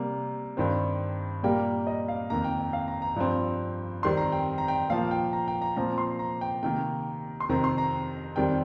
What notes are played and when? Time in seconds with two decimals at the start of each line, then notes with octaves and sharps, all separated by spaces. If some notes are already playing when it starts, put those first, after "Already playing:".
Already playing: C3 G3 A#3
0.57 G2 D#3 C4
1.43 A#2 G3 A#3 G5
1.87 D#5
2.08 F5
2.30 F2 D#3 A#3 A#5
2.44 G5
2.59 G5
2.73 F5
2.88 A#5
3.02 A#5
3.16 G2 F3 C4
4.03 F2 D#3 G3 C4 C6
4.17 A#5
4.32 G5
4.58 A#5
4.68 G5
4.90 A#2 F3 A#3 F5
5.11 G5
5.33 A#5
5.48 G5
5.62 A#5
5.76 A#2 F3 C4 A#5
5.98 C6
6.19 A#5
6.41 G5
6.63 C3 D#3 A#3 G5
7.40 C6
7.49 F2 C3 D#3 C4 A#5
7.64 C6
7.78 A#5
8.36 F2 D#3 G3 C4 G5